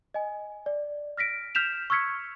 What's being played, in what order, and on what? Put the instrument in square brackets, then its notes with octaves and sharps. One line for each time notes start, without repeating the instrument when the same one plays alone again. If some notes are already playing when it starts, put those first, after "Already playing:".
[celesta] D#5 G#5
D5
F6 A#6 B6 D7
F6 G6 B6 E7 F7
C#6 E6 F6 G#6 B6 C#7